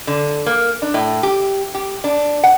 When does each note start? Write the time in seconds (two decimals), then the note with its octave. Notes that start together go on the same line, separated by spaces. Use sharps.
0.07 D3
0.46 A#3
0.82 D4
0.94 A2
1.23 G4
1.74 G4
2.04 D4
2.44 F#5